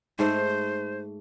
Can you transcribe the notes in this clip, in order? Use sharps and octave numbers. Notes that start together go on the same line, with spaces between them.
G#2 A3 C5